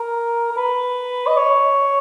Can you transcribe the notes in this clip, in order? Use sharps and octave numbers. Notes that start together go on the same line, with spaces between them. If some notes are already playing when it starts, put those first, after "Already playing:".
Already playing: A#4
A#4
B4
D#5
C#5